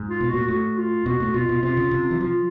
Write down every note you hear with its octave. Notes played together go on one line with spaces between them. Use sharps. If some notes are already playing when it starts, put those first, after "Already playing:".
Already playing: G#2
F4
B2
A#2 F#4
A2 F#4
F4
B2 F#4
A2
B2 F4
B2
C3 F4
C#3
C3
E3
F3 F4